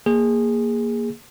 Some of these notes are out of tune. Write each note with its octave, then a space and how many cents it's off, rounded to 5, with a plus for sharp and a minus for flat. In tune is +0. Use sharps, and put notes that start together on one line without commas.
A#3 +0 G#4 -15